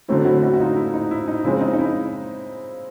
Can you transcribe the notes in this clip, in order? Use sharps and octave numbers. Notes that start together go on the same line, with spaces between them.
D3 F#3 A3 C4 E4
E4 F#4
E4 F#4
F#4
D#4 F4
E4
D#4
E4
D#4
C#3 F3 G#3 C4 E4
D#4
D#4
E4